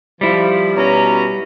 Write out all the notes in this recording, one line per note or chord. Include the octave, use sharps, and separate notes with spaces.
F3 G3 E4
B2 C#4 A#5